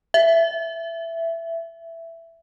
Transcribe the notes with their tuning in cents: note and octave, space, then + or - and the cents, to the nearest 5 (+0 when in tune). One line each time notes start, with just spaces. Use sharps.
E5 +10